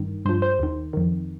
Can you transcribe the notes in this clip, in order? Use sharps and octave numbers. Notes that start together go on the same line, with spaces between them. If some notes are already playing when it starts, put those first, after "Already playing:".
Already playing: G2 D#3
G2 F3 C5
C5
D#2 D#3
F2 D#3